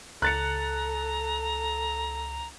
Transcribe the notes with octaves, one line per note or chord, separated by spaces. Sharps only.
C#2 A4 A#5 F#6 A6 C#7